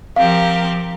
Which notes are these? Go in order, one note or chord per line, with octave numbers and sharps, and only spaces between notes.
F3 C4 G4 A#4 F5